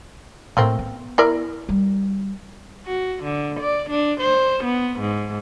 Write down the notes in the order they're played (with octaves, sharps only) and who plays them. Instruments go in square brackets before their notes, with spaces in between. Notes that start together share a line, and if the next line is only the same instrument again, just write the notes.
[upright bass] A2 [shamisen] A3 A#3 C4
[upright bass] B3
[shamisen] E4 A#4 D5
[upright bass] G3
[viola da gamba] F#4
D3
D5
D4
C5
B3
G#2